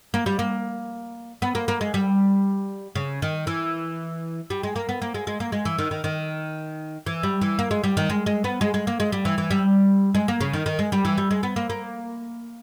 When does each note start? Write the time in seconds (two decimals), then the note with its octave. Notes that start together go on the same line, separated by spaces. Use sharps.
0.14 A#3
0.26 G3
0.39 A#3
1.42 B3
1.55 A#3
1.68 A#3
1.81 G#3
1.94 G3
2.95 C#3
3.22 D#3
3.47 E3
4.50 G3
4.63 G#3
4.76 A#3
4.89 B3
5.02 A#3
5.14 G#3
5.27 G#3
5.40 A#3
5.52 G#3
5.65 E3
5.78 D#3
5.91 D#3
6.04 D#3
7.06 E3
7.23 G3
7.41 E3
7.59 A#3
7.71 G#3
7.84 G3
7.97 D#3
8.10 G#3
8.26 G#3
8.44 B3
8.61 G#3
8.74 G#3
8.87 A#3
9.00 G#3
9.12 G3
9.25 E3
9.38 E3
9.51 G3
10.15 G#3
10.28 A#3
10.41 C#3
10.53 D#3
10.66 D#3
10.79 G#3
10.92 G3
11.05 E3
11.18 G3
11.31 G#3
11.43 B3
11.56 A#3
11.70 A#3